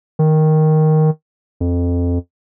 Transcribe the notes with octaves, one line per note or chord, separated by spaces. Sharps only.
D#3
F2